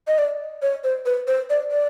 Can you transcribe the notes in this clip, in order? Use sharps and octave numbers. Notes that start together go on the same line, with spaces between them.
D#5
D5
C#5
C5
B4
C5
D5
D5